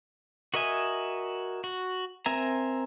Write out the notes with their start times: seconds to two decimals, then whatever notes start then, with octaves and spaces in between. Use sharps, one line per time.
0.54 F#4 A#4 D#5 E5 G#5
1.64 F#4
2.26 C4 A#4 E5 G#5 A#5